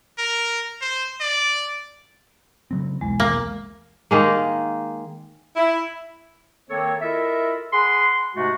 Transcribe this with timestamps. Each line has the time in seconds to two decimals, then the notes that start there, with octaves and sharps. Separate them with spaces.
0.18 A#4
0.81 C5
1.21 D5
2.71 C#3 F#3 C4
3.01 B1 E2 E3 G#3
3.20 A#3
4.11 D#3 G#3 A#3
5.56 E4
6.70 D#3 A#3 C4 A4 C#5
7.01 E4 F4 A4 A#4 D#5 E5
7.73 G#4 F#5 B5 C6
8.36 G#2 C3 G#3 A3 F#4